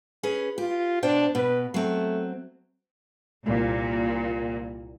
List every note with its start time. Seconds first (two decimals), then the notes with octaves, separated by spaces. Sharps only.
0.23 C#4 G#4 B4
0.58 F4 G4
1.03 B2 D4 C5 G5
1.35 B2 B4
1.74 F#3 A3 C4
3.45 C2 A#2